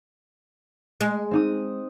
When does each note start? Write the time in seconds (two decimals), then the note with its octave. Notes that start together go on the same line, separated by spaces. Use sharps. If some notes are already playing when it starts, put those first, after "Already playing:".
1.01 G#3
1.31 C4 D#4 D#6